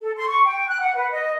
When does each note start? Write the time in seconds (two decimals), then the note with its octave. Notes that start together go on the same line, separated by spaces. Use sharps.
0.01 A4
0.17 C6
0.28 C#6
0.45 G5
0.68 F#6
0.80 F#5
0.95 B4
1.11 D#5